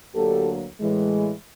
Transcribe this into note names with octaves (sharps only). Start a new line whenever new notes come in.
D2 D3 F#3 A#3 G4 A4
A2 E3 G#3